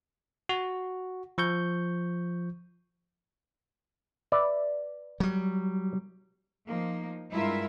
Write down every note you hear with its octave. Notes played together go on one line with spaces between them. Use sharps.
F#4
F3 C#6 G6
B4 D5 E5
F#3 G3
F3 A#3 D#4
G2 G#3 E4 F4 A#4 E5